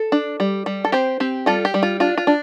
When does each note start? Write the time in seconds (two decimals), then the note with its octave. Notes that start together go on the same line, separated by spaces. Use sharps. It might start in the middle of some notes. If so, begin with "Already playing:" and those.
Already playing: A4
0.12 D4
0.40 G3
0.66 G3
0.85 A4
0.92 C4 G4 C5
1.20 C4 G4
1.46 G3 F4 A4
1.65 G4
1.74 G3
1.83 F4
2.00 D4 F4
2.18 F4
2.27 D4